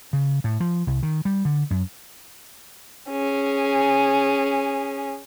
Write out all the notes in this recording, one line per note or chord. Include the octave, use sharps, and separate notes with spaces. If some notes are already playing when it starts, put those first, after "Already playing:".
C#3
A2
F3
C2
D#3
G3
D3
F#2
C#4 G#4